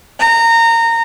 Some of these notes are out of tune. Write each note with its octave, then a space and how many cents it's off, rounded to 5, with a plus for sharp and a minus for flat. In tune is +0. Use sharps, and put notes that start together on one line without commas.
A#5 -20